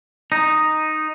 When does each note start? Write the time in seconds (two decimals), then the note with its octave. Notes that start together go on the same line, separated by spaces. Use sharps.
0.32 D#4